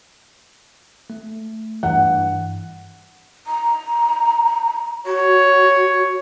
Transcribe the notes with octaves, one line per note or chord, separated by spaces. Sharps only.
A3
G2 E3 F#5
A#5
F#4 C#5